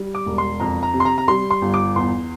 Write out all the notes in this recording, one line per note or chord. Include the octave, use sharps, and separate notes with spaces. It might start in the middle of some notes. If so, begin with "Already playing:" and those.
Already playing: G3
D6
E1
C6
F2 A#5
A#5
C3
C6
A#5
A#5
G3 C6
C6
G1
D6
E2 C6